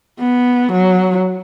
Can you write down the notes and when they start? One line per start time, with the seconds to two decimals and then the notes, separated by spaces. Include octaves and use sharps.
0.20 B3
0.72 F#3